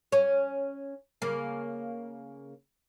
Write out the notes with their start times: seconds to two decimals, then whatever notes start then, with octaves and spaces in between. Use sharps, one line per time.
0.12 C#4 C#5
1.22 C#3 A#3